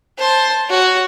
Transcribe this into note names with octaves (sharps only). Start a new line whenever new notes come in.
C5 A5
F#4 C#5